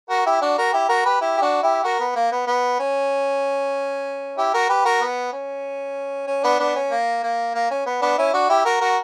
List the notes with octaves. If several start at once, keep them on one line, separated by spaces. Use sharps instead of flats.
F#4 A#4
E4 G4
D4 F#4
F#4 A#4
E4 G4
F#4 A#4
G4 B4
E4 G4
G4
D4 F#4
E4 G4
F#4 A#4
B3
A#3
B3
B3
C#4
E4 G4
F#4 A#4
G4 B4
F#4 A#4
B3
C#4
C#4
B3 D4
B3 D4
C#4
A#3
A#3
A#3
C#4
B3
B3 D4
C#4 E4
D4 F#4
E4 G4
F#4 A#4
F#4 A#4